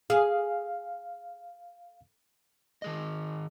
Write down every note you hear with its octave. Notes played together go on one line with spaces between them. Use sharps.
G#4 F5
D#3 G#4 D#5